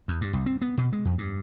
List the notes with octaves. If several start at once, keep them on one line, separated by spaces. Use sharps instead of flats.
E2
G2
C2
C4
B3
B2
G#3
F2
G2